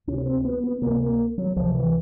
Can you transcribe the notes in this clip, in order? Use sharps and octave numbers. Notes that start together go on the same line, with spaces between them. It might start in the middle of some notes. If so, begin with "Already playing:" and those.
C#2 C3 C#4
C#4
C4
B3
B3
C#2 C3 A#3
A#3
F#3
C#2 C3 F3
E3